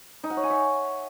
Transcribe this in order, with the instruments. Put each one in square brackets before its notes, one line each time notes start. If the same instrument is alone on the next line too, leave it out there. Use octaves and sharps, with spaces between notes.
[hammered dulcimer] D#4
F#5
C#5
G#5
E5